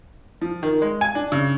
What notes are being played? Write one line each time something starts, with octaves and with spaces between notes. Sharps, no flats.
F3
D#3
G#3
G#5
D4
C#3